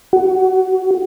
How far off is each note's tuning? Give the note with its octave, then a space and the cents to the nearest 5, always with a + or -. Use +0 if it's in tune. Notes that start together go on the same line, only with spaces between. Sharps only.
F#4 +25